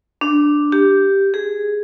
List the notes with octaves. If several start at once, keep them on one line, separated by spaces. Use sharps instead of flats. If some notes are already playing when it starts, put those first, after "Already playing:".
D4
G4
G#4